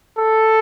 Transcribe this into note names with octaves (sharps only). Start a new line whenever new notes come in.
A4